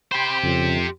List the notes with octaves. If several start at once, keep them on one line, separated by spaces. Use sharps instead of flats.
G4 C5 G5 B5 C6
F2 C#3